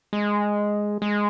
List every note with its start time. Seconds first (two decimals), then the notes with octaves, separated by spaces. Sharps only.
0.13 G#3
1.02 G#3